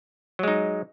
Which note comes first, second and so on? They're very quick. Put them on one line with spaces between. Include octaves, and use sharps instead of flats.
F#3 G#3 D#4